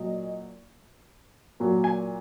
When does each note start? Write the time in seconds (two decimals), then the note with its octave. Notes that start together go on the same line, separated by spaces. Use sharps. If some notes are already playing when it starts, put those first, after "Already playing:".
Already playing: A#2 F#3 D#5
1.60 A#2 F#3
1.84 G#5